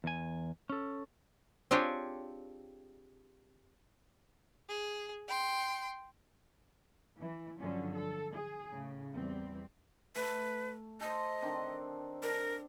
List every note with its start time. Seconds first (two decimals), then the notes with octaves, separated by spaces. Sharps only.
0.04 E2 G#5
0.70 C#4 A4
1.71 C4 D4 F4 G4 G#4 C#5
4.69 G#4
5.28 G5 C6
7.19 E3
7.58 G2 D3 F3 F#3 C#4
7.94 A4
8.33 G#4
8.71 A2 C#3
9.14 E2 G3 C4
10.15 A3 B4
11.01 A4 C5 D#5
11.42 D#3 C4 D4
12.23 D4 A#4